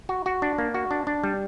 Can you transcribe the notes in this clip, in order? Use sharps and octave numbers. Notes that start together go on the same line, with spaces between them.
F#4
F#4
D4
A#3
F#4
D4
D4
G3